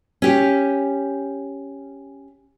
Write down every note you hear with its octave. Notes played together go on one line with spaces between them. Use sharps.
C#4 G4